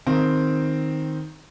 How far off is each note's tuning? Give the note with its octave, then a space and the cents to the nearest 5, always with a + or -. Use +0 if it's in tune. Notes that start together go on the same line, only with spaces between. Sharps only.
D#3 +0 C4 +0